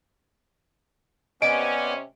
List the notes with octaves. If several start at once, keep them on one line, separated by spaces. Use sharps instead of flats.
C3 B3 C#4 D5 D#5 G#5 D7